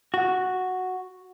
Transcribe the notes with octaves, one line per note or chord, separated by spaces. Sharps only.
F#4